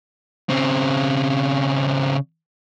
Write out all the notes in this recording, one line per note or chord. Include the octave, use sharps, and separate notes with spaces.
C#3 C4